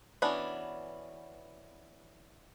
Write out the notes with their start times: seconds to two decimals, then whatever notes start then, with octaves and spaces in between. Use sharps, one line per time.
0.22 E3 B3 C#4 D4 F#4